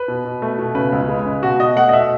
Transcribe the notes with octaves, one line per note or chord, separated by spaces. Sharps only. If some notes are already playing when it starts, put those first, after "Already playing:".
Already playing: B4
B2
B2
A3
B2
C#3 B4
C#2
G#3
C#3
B2 F#4
B2 D#5
A3 F#5
D#5
B2 E5